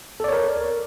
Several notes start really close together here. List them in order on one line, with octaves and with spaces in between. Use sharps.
A4 D5 C#5 A#4